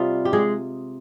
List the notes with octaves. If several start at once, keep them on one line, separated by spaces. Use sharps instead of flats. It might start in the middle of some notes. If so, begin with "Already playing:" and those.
Already playing: C3 G3 F4 D#5 F5
G4
G#3 G#4